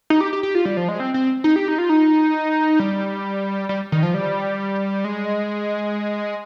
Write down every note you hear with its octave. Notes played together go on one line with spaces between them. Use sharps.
D#4
G4
G4
G4
F4
G3
F3
G#3
C4
C4
D#4
G4
D#4
F4
D#4
G3
G3
D#3
F3
G3
G#3